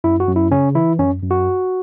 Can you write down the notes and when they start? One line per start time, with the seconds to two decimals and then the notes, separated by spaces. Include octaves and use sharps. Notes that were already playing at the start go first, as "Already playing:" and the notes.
0.04 F#2 E4
0.20 F#4
0.28 F#2
0.36 E4
0.51 C#3 C#4
0.75 E3 E4
0.99 F#2 C#4
1.22 F#2
1.31 F#4